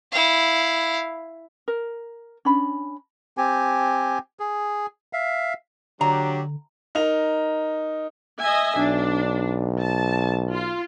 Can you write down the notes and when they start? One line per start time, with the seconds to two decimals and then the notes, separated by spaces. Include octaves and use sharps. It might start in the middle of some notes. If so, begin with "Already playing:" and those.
0.12 E4 F5
1.68 A#4
2.45 C#4 D4 B5
3.37 C4 G4 G#5
4.40 G#4
5.13 E5 F5
6.01 D3 F#3 D4 G4 A#5
6.95 D#4 A#4 F7
8.40 D#5 E5 G#5
8.77 B1 D4
9.79 A5
10.51 F4